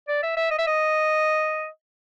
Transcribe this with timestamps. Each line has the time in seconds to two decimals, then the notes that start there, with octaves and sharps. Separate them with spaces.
0.08 D5
0.23 E5
0.37 E5
0.51 D#5
0.59 E5
0.67 D#5